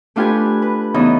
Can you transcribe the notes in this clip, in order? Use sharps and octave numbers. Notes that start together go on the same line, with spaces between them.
A3 D4 F4 G4 B4 G#5
B4
E2 C#3 E3 B3 D#4